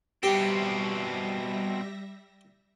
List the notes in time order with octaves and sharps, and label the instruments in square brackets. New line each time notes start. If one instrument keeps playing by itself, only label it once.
[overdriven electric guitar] B2 C4 [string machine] G3 E5 A#6 [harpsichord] G4